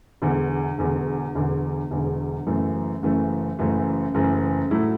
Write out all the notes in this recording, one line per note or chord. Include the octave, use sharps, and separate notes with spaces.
E1 E2 D3
E1 E2 D3
E1 E2 D3
E1 E2 D3
F#1 F#2 E3 A3
F#1 F#2 E3 A3
F#1 F#2 E3 A3
F#1 F#2 E3 A3
A2 F#3 A3 E4